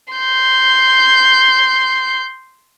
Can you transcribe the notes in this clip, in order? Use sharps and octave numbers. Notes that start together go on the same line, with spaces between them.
C6 G6